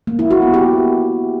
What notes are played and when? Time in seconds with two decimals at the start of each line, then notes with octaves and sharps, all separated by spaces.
0.07 A#3
0.19 E4
0.31 F#4
0.42 B3
0.54 G4